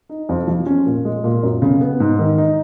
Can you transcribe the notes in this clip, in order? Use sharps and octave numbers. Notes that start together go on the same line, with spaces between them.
D#4
F2
F3
C#4
A#2
G#3
A#2
F#2
C#3
B3
G#2
D#3
D#4